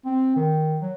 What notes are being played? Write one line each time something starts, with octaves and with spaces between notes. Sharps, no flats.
C4
D#3
F#3